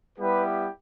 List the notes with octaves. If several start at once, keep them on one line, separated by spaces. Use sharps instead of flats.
G3 B3 E4 G4 B4